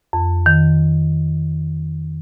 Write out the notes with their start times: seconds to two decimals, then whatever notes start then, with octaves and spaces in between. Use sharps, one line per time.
0.13 F2
0.46 D#3